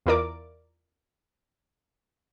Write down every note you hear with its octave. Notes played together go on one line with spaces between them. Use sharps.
E2 E4 F4 A#4 D5 D6